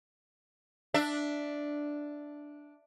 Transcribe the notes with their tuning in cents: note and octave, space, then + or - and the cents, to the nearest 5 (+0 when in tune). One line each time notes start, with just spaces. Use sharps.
D4 +0 E5 +0